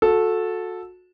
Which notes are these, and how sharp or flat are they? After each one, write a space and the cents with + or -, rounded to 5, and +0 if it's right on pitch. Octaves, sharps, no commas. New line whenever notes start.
F#4 -30 A4 -5